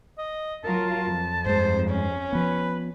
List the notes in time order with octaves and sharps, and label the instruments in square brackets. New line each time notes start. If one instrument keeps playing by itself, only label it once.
[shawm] D#5
[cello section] F#3 F4 A#4 [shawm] A5
[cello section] F2
[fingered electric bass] G2 G#3 [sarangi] C5
[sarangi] C#4
[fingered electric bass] F3 B3 [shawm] B4